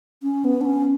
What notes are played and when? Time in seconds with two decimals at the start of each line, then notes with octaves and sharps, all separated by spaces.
0.23 C#4
0.45 B3
0.61 D4
0.65 C#4